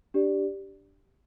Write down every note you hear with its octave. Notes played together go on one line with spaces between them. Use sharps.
D4 G4 D5